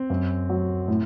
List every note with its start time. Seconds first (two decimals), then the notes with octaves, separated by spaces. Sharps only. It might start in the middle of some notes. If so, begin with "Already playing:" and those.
Already playing: C4
0.10 F#2
0.50 F#3
0.88 A2